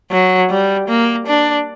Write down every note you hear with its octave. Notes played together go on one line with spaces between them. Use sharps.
F#3
G3
A#3
D4